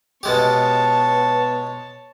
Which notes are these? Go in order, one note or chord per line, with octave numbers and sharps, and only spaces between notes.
B2 G#3 B3 G4 C#5 A5